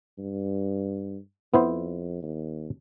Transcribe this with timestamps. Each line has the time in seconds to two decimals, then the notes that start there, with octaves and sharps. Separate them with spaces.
0.18 G2
1.54 F2 B3 E4 C5
2.22 D#2